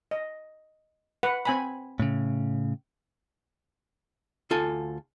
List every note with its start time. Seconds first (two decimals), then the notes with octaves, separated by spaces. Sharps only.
0.11 D#5
1.23 B4 F#5
1.45 C4 G#5 B5
2.00 A2 C#3
4.50 D2 F4 A4 G#5